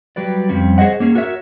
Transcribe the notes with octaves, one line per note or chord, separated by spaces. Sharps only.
F#3 G3 G4 B4 D5
F2 G3 C4 C#4
G#4 C5 C#5 D#5 F#5
A#3 C#4 G#4
F#4 A#4 C#5 E5